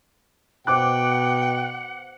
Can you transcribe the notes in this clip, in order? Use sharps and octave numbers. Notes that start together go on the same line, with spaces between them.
B2 C5 F#5 G5 D6 F#6